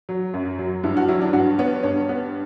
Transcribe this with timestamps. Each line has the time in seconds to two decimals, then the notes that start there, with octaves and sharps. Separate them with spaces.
0.09 F#3
0.34 F#2
0.59 F#3
0.84 G2 E4
0.97 F#4
1.08 F#3 E4
1.21 D4
1.33 G2 F#4
1.59 B3 C#5
1.83 G2 C#5
2.09 B3